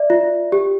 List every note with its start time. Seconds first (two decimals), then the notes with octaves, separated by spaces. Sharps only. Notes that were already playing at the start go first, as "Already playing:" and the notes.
Already playing: D5 E5
0.10 F4
0.52 G4